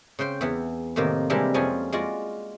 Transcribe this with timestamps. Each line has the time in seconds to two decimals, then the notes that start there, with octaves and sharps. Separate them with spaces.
0.19 C#3 C5 G5 C6
0.41 E2 E3 B3
0.96 A2 C3 D#3 A#3
1.30 C3 E3 G3 G#3 D4 A#4
1.54 F2 F3 C#4 F4 G#4 G#5
1.92 G#3 F4 F#4 D5